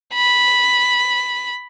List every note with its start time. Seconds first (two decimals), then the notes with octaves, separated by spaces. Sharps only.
0.14 B5